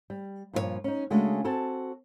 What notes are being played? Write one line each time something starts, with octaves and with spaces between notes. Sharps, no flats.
G3
G2 A#2 F3 F4 C#5
C#4 D#4
C#3 G#3 A3 C#4 D4 F#4
C4 F#4 A4 G#5 A5